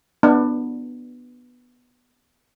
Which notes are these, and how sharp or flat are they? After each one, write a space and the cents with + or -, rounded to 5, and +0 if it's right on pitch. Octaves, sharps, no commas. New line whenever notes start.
B3 +0 D4 +25